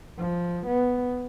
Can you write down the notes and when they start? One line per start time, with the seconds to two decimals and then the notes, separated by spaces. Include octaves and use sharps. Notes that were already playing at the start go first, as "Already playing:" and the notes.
0.18 F3
0.66 B3